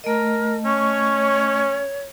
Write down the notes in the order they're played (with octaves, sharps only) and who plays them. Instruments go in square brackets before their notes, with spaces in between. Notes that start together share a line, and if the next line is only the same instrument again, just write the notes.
[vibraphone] A3 D#5 [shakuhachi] A#4
[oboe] C#4 [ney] C#5 [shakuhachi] C#6